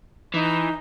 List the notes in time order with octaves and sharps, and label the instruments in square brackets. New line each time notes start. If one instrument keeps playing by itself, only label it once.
[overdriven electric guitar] E3 [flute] D#4